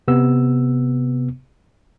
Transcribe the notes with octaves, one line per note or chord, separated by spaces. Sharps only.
C3 B3 E6